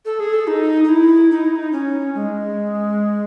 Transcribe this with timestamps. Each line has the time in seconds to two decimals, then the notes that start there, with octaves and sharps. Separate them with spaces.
0.05 A4
0.20 G#4
0.33 A4
0.47 D#4
0.84 D#4
0.89 E4
1.31 D#4
1.44 E4
1.56 D#4
1.72 C#4
2.15 G#3